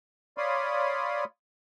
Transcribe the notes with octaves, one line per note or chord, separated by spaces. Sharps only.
C#5 D5 F5 B5 C6 D#6